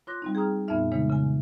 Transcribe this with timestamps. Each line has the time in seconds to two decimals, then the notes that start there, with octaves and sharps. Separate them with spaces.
0.07 F4 C#5 C6 D6 F#6 A#6
0.22 G3 C4 D#4
0.35 G#4 G5 A#5 D#6 F6
0.68 F2 A#2 B3 D#4 E5 F6
0.92 C#3 E3 G#3 D#4 C#5
1.10 C#3 G#5